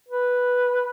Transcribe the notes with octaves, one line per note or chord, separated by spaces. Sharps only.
B4